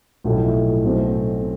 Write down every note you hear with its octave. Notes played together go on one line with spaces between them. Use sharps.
B1 A2 F3 A3 E4
B1 B2 A3 C4